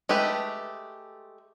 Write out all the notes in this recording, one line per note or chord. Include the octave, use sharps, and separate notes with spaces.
G#3 A3 G4 B4